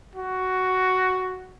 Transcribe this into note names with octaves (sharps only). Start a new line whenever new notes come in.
F#4